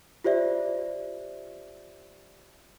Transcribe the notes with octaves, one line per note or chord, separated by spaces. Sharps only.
F4 G4 C5 D5 E5